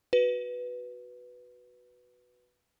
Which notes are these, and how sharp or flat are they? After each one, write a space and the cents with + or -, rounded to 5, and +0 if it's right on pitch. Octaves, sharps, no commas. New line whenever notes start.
F#4 +0 B4 +0